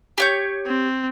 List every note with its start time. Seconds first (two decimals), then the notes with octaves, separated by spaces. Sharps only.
0.18 G4 C#5 G6
0.66 C4